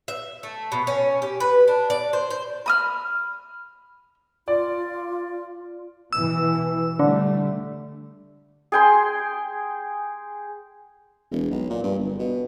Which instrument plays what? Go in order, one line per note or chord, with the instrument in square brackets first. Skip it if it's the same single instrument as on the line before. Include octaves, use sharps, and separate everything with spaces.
[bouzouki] E5
A3
B2
C#4
G4
B4
D4
D5
C5
C5
[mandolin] B5 D#6 F6
[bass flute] F4 [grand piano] D5
[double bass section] B2 E3 [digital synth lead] E6
[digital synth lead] D3 [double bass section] G3 A3
[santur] G#4 G5 C6
[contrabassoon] E1
B1
A#2
G2
G1
B2